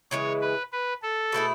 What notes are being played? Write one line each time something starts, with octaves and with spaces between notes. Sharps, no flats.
C#3 E3 G#3 C#5
B4
B4
A4
B2 A3 E4 G#4